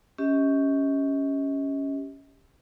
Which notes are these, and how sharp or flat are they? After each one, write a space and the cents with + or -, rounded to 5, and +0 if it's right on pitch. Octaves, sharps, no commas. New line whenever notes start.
C#4 +5 G4 +0 D#5 +40